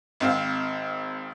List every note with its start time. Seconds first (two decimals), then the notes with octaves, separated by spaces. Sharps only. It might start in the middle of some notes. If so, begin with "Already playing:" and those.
0.20 G#1 C4 F5